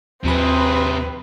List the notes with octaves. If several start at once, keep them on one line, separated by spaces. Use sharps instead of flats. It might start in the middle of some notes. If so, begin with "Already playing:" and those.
D#2 C3 F3 C4 G#4 B4 B5